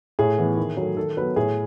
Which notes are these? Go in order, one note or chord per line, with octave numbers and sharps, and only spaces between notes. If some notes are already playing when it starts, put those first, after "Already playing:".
A2 G#4
E3 B3
D#3
F#3 A3
D#3 A4
F#3 B3 B4
A2 G#4